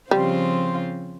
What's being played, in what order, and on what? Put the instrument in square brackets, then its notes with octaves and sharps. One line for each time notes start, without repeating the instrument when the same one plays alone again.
[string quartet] C#3 F3 C4 F4 C5 [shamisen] G3